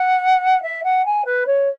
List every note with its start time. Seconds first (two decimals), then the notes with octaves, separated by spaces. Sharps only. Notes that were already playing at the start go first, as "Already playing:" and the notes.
Already playing: F#5
0.62 E5
0.83 F#5
1.05 G#5
1.25 B4
1.46 C#5